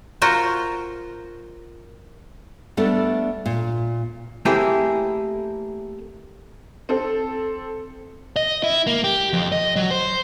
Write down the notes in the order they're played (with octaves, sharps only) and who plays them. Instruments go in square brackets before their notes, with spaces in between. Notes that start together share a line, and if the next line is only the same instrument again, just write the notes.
[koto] F4 F#4 A#4 C5
[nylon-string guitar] G3 A3 B3 D4 A4
A#2
[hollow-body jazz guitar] A3 A#3 C4 E4 G4 G#4
[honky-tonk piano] C4 A4
[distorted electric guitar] D#5
E4
A#3
G4
F2
D#5
F#3
C5